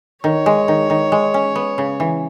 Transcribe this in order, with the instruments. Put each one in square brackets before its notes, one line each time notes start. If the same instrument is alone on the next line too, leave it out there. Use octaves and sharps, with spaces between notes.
[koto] D#3 [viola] C#5
[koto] G#3
D#3
D#3
G#3
C#4
B3
C#3
E3